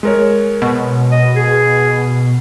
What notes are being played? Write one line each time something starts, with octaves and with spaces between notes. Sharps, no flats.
G#3 A#4 C#5
B2
D#5
G#4